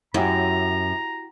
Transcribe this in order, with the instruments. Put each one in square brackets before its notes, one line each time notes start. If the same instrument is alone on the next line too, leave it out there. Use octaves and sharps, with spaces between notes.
[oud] F#2 [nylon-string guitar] E4 F#4 G4 [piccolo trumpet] A#5